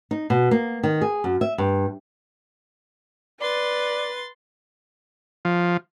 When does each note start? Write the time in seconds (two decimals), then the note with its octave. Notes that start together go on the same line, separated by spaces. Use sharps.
0.11 D#4
0.30 B2
0.51 A#3
0.83 D#3
1.01 G#4
1.24 F#2
1.41 E5
1.58 G2
3.41 B4 D5 C6 A6
5.45 F3